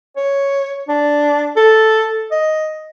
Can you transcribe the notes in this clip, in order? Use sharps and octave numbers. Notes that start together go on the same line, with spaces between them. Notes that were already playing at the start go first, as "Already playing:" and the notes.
C#5
D4
A4
D#5